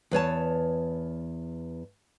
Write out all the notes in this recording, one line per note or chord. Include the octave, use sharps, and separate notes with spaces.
E2 B4 C#5 A5